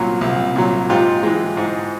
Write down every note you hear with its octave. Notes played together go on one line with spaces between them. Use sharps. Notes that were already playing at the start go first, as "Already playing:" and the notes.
Already playing: C2 A#2 F#3
C2
A#2 F#3
G#2 F4 G4
E3 G#3
G#2